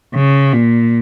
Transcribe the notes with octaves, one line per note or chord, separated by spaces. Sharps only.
C#3
A#2